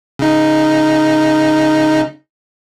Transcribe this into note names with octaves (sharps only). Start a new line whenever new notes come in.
C#3 D#4